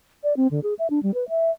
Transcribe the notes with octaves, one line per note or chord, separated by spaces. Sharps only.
D5
C4
D3
G#4
E5
D4
G3
B4
E5